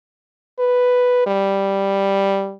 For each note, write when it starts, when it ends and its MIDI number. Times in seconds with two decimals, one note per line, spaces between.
0.59 1.21 71
1.27 2.54 55